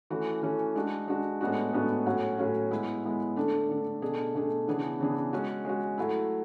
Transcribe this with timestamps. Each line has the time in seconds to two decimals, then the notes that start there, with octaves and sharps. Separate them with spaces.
0.10 E3 A3 C#4 F#4
0.42 E3 A3 C#4 F#4
0.75 G#3 D4 F#4
1.08 G#3 D4 F#4
1.41 A2 G#3 B3 D4 F#4
1.73 A2 G#3 B3 D4 F#4
2.06 A2 F#3 C#4 F#4
2.38 A2 F#3 C#4 F#4
2.71 G#3 B3 E4
3.04 G#3 B3 E4
3.36 D3 A3 D4
3.69 D3 A3 D4
4.02 B2 A3 D4 G#4
4.35 B2 A3 D4 G#4
4.67 C#3 E3 B3 D4 G#4
5.00 C#3 E3 B3 D4 G#4
5.33 G#3 C#4 F#4
5.65 G#3 C#4 F#4
5.98 F#3 A3 E4